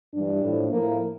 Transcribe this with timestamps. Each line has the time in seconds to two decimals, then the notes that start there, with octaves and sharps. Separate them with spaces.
0.14 G2 E3 G3 D4
0.42 A2 F3
0.71 A2 F3 A#3